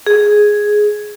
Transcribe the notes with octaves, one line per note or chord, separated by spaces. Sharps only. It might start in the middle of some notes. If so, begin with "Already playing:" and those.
G#4